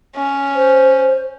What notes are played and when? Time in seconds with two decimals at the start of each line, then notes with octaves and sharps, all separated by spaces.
0.16 C#4
0.55 C5